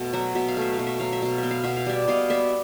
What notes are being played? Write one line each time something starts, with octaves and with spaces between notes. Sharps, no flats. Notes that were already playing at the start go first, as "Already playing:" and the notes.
Already playing: B2 A3
F#3 E5 F#5
B2 E5
F5
A3 E5
F5
B2
E5
F#3 F5
E5
B2 F5
E5
B3
F5
B2 E5
F5
G3 D5 E5
B2 D#5 F5
B3 D5 E5